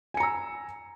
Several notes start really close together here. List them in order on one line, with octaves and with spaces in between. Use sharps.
G#5 C#7 A#5 E6